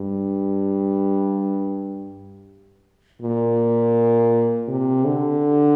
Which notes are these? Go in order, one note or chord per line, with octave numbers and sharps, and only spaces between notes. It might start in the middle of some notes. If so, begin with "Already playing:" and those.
Already playing: G2
A#2
C3
D3